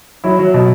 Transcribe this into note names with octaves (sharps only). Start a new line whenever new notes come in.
F#3 E4
F#3
B2